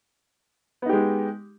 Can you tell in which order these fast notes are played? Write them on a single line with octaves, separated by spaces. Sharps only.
B3 D#4 G4 G#3